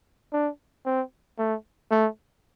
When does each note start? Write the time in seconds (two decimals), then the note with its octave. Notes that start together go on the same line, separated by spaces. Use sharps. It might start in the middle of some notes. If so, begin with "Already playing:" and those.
0.33 D4
0.85 C4
1.38 A3
1.91 A3